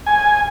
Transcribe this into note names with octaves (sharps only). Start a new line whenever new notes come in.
G#5